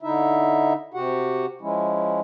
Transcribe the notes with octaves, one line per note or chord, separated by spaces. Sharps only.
D3 D#4 E4 E5
C3 F#4 G4 F#5
F3 G#3 C#4 E4